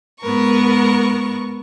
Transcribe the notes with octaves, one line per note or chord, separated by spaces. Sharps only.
G#2 B3 A#4 C#6